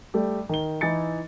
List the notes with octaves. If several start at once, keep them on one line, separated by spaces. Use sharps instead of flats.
G3 A3 G4
D#3 G7
E3 D#4 E4 A6 C#7